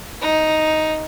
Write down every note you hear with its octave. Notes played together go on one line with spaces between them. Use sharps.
D#4